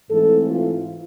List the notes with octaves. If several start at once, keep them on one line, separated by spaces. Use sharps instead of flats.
G#2 E3 A3 C4 A4
F4